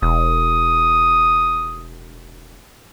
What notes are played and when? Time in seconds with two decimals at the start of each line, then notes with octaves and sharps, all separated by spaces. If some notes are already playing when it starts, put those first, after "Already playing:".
0.02 E1 D#6